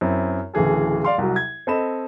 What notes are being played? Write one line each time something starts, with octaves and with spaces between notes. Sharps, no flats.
F#2 C4 E4
D1 C#3 E3 G#4 A4
D5 F5 C6
C2 F#3
G#6
C4 A4 D#5 B5 E7